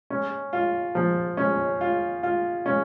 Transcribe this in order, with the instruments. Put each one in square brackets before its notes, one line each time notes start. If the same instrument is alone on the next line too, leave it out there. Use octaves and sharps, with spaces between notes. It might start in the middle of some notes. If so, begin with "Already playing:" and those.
[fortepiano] C#4
F4
F3
C#4
F4
F4
C#4